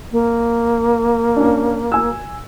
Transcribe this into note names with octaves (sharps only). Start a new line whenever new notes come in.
A#3
C#4 D4
G#5 E6